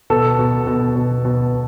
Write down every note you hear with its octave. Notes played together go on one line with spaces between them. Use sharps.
B2 A4
B2
B2
B2
B2